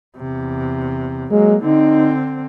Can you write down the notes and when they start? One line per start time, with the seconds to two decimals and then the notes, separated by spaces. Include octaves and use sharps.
0.17 E2 C3
1.31 F#3 G#3 A#3
1.63 D3 C4 D#4